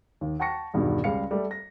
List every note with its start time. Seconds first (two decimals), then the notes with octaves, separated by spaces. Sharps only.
0.21 D#2
0.40 F#5 G5 A5 C#6 A#6 C#7
0.74 E2 G2 B2 D#3
1.04 C#2 G3 F5 C#7
1.31 G3 A3
1.51 A#6